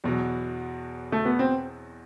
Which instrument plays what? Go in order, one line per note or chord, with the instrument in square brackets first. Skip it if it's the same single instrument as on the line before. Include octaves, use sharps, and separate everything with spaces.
[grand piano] E2 B2 F#3
[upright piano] A3
B3
C4